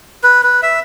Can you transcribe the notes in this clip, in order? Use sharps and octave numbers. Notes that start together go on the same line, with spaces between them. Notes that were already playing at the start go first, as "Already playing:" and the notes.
B4
B4
E5